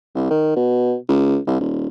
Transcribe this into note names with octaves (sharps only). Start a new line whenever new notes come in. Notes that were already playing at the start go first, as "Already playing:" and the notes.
C2
D#3
B2
C#2
C2
D#1